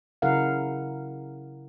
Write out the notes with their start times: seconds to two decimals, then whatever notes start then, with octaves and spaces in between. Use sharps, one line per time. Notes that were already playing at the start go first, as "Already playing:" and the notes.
0.22 C#3 F#3 E4 A#4 F5 F#5